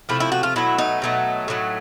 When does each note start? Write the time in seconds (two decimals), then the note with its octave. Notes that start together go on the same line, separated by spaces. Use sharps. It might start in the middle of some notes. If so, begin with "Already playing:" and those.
0.09 C3 F3 A3 E4
0.20 E4
0.32 F#4
0.43 F4
0.56 B2 F#3 A3 E4
0.78 D#4
1.02 B2 F#3 A3
1.48 A2 F#3 A3